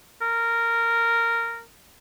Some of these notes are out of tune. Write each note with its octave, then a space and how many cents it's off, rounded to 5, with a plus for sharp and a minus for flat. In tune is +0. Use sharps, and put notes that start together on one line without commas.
A#4 -10